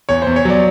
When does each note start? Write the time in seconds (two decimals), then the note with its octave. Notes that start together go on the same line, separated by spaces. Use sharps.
0.09 E2 C#5
0.22 E2 C5
0.36 C#5
0.45 F#3 D5